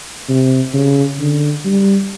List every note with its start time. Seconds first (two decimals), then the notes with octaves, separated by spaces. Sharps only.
0.29 C3
0.74 C#3
1.20 D3
1.65 G3